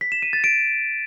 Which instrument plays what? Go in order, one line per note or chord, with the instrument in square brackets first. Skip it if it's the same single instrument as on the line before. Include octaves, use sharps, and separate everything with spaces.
[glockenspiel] B6
E7
D#7
A6
D7